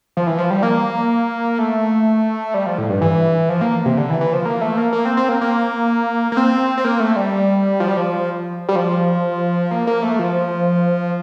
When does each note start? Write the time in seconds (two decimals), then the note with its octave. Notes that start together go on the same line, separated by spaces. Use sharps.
0.17 F3
0.27 E3
0.38 F3
0.51 G3
0.63 A#3
1.58 A3
2.54 G3
2.66 F3
2.78 A2
2.90 G2
3.01 E3
3.49 F3
3.61 A#3
3.85 C3
3.97 D3
4.10 E3
4.21 E3
4.33 F3
4.45 A#3
4.61 A3
4.77 A#3
4.93 A#3
5.05 C4
5.17 C4
5.29 A#3
5.41 A#3
6.32 A#3
6.37 C4
6.77 C4
6.85 A#3
7.00 A3
7.16 G3
7.80 F3
7.88 G3
7.97 F3
8.69 G3
8.76 F3
9.71 A#3
9.87 A#3
10.03 A3
10.19 F3